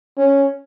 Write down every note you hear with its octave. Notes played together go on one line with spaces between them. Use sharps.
C#4